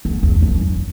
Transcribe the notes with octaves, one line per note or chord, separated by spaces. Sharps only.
E2
E2
F#2